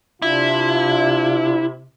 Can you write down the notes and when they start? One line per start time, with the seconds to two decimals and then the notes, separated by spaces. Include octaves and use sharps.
0.22 C3 D4 E4 F4